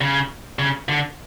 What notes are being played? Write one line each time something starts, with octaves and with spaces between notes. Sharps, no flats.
C#3
C#3
D3